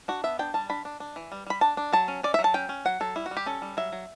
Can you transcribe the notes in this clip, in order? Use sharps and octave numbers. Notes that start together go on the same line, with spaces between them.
D4 F#4
B3 E5
D4 G5
G3 A5
D4 B5
D4
D4
E3
G3
G3 B5
D4 A5
D4
F#3 A5
C#4
C#4 D5
E5
F#3
A5
C#4 G5
C#4
F#3 F#5
F#3 A4
G3 E4
F#4
G3
G4
C#4 A4
G3
F#3 E5
F#3